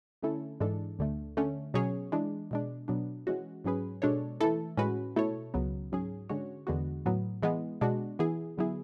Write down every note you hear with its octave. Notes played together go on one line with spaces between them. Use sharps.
D3 A3 C#4 E4 A4
G#2 E3 G#3 D4 A4
D2 D3 A3
D3 A3 C#4
B2 F#3 C#4 G#4 C#5
E3 G#3 D4
B2 G#3 D4
B2 F#3 B3 D4
E3 G#3 C#4 F#4
G#2 F#3 C#4 G#4 B4
B2 G#3 D4 A4 C#5
E3 A3 E4 A4
A2 G#3 C#4 F#4 B4
B2 A3 E4 A4 C#5
C#2 C#3 F#3 B3
G#2 F#3 C#4 G#4
D3 G#3 C#4 F#4 C#5
E2 D3 G#3 B3 F#4
A2 F#3 B3
E3 G#3 B3
B2 G#3 D4 F#4
E3 B3 E4 G#4
D3 F#3 B3 E4 G#4